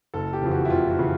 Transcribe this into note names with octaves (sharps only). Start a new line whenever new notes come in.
F#1 A4
G4
F2 C#3 E3
F#4
E4
F#1 F4
F#4
C#3 E3